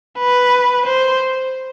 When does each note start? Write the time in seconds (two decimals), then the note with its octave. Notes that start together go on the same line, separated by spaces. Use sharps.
0.19 B4
0.86 C5